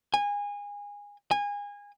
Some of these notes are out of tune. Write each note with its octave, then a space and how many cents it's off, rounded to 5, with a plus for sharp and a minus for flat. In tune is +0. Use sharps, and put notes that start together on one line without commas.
G#5 -25
G#5 -25